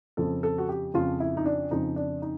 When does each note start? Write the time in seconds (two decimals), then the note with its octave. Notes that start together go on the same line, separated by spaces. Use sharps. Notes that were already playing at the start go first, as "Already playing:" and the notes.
0.17 F2 C#3 F3 A4
0.43 A4
0.58 F#4
0.69 G4
0.94 F2 C#3 F3 F4
1.20 E4
1.37 D#4
1.46 D4
1.71 F2 C#3 F3 D#4
1.96 D4
2.22 D#4